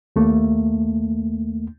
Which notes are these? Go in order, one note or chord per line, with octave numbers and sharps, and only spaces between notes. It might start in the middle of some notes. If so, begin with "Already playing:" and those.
D#2 A3 A#3